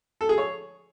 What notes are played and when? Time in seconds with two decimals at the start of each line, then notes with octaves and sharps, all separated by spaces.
0.21 A4
0.29 G#4
0.38 C#5